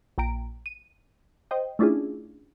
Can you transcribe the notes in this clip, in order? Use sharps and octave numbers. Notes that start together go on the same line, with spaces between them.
A#1 G5 A#5 D7
D#7
C5 D#5 G5
A3 C#4 D4 E4 F4 G#4